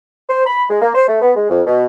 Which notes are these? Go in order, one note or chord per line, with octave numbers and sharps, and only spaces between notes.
C5
B5
G#3
A#3
C5
A3
B3
G#3
F2
B2